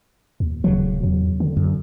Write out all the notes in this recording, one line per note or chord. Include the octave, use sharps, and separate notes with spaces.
D#2
D#1 C#3 F#3
E2 F#3
D3
F#2